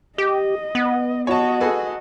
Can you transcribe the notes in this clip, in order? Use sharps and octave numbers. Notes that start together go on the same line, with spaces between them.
G4 D#5
B3
F#4 C#5 D#5 A5
G#4 A4 B4